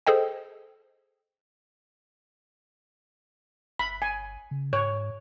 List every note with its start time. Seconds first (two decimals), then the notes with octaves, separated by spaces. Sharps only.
0.07 G#4 A4 C5 D#5 G5
3.79 G1 B5
4.02 G#5
4.51 C#3
4.73 G#2 C#5